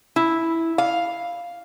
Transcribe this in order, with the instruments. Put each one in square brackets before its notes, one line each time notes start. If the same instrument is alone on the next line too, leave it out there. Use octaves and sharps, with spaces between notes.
[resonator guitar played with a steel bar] E4
F5